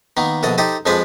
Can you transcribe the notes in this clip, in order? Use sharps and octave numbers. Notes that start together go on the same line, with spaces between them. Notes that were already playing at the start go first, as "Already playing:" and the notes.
D#3 A#3 B3
A#1 B2 A4 D#5
D#4 G4 A4 C5 D#5
F2 F3 G#3 D4 B4 C5